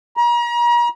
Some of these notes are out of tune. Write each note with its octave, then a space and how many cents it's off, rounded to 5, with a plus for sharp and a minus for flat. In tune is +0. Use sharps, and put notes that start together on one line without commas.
A#5 +40